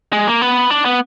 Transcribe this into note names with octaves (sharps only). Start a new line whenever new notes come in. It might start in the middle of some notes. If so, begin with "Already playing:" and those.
G#3
A#3
B3
D4
B3